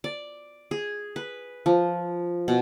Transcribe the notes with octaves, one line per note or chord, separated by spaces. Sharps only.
D5
G#4
B4
F3
B2